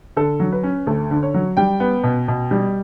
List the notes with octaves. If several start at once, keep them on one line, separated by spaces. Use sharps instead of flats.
D3 A4
F#3
B4
C#4
D2 A4
D3
C#5
F#3
G3 G5
B3
B2
B2
G3